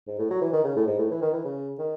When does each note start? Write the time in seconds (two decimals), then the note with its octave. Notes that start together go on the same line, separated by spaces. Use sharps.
0.07 G#2
0.18 A2
0.30 F#3
0.41 E3
0.53 D#3
0.64 C#3
0.76 A2
0.87 G#2
0.98 A2
1.11 E3
1.22 D#3
1.33 E3
1.45 C#3
1.79 D#3